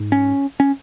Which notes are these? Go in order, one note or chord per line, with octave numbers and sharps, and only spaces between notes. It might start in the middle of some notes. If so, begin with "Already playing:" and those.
Already playing: G#2
C#4
C#4